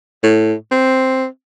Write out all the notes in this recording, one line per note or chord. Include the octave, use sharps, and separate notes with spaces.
A2
C4